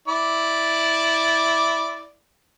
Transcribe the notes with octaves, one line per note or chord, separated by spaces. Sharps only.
E4 D5